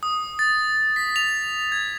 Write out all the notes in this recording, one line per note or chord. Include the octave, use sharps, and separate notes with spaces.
D#6
A6
B6
F7
G#6